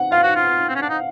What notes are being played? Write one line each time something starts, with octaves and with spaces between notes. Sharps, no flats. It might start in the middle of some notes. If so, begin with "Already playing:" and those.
Already playing: F#5
F4 F5
F#4
F4
C4
C#4
D4
D#4